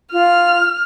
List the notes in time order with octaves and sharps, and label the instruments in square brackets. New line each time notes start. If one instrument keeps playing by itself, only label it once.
[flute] F4 [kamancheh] F6